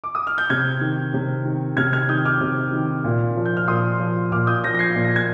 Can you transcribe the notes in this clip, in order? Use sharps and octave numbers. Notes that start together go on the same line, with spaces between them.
D6
D#6
F6
G6
C3 F6 G#6
D#3
C3
D#3
C3 F6 G#6
F6 G#6
D#3 D#6 G6
D6 F6
C3
D#3
A#2
F3
G6
F6
A#2 C6 D#6
F3
A#2 D6 F6
D#6 G6
F3 G6 A#6
A#6
G#6 C7
A#2 C7
A#6
G#6